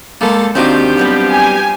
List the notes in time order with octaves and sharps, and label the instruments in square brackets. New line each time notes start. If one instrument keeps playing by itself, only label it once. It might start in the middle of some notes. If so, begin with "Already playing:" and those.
[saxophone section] E2 A4 [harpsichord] G#3 A#3
[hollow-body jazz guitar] D#2 D#4 F#4 [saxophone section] F3 G4 [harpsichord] C4 D4
[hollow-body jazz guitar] F#3 G3 B3
[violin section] G#5